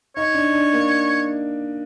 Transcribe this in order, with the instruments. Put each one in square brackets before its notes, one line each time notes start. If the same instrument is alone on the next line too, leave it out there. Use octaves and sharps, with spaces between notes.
[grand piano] D#4 [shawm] C#5
[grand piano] D4
D4
A#3